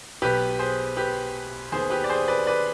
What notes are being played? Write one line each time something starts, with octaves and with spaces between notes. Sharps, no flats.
B1 B2 B3 G4 B4
G#4 C5
G4 B4
D#2 D#3 B3 G#4 C5
G4 B4
D5
G#4 C5
B4 D5
B4 D5